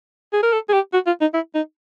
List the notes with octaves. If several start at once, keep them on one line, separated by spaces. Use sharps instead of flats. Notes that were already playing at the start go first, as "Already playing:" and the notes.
G#4
A#4
A4
G#4
G4
F#4
F4
D#4
E4
D#4